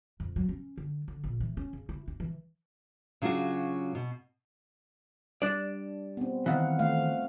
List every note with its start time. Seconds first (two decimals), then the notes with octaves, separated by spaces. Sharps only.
0.20 F2
0.36 F#3
0.49 C#4
0.78 D3
1.08 D3
1.24 A#1
1.40 E3
1.57 C#4
1.73 C#3
1.89 E4
2.08 D4
2.20 E3
3.22 C#3 F#3 D4 F4 F#4
3.95 B2
5.42 G3 D4 D5
6.17 B3 C4
6.46 D#3 E3 C4 F5 F#5
6.79 A3 F5